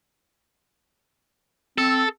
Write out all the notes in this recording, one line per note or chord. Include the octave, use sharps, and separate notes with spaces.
C4 A4